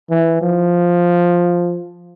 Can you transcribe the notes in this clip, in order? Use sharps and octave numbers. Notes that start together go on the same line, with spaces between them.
E3
F3